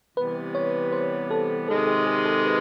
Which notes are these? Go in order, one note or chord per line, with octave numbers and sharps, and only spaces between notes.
C3 E3 G3 B3 B4
C#5
C5
A4
C3 D#3 G#3 A4
G#4
G#4
A4
B4